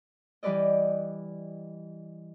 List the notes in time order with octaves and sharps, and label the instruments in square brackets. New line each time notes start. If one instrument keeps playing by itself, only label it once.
[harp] E3 G3 G4 B4 D5 D#5